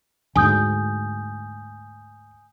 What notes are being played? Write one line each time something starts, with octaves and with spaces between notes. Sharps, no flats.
D2 G#2 G#5 D#6 G6